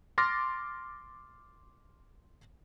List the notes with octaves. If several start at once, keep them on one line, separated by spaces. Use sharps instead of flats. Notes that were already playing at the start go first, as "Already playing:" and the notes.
C6 D6 F6 A6 A#6